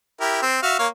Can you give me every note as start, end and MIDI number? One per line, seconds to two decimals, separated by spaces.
0.21 0.41 64
0.21 0.41 67
0.21 0.41 70
0.42 0.62 60
0.63 0.78 66
0.63 0.78 76
0.63 0.78 77
0.79 0.87 58
0.79 0.87 73
0.79 0.87 77